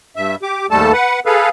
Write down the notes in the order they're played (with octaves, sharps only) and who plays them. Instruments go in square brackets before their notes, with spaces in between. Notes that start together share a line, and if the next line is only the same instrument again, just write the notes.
[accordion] G2 E5
G4 D6
D#2 G#2 G3 A3 A4 A5
B4 F#5
G#4 A4 B4 F5